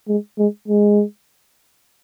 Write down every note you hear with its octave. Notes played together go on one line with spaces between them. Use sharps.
G#3
G#3
G#3